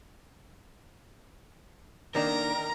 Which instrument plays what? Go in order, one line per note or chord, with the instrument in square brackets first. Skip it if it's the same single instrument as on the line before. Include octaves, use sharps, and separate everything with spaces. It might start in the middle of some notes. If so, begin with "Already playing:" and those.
[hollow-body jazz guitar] D#3 A#3 D4 [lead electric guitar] A#4 [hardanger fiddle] A#5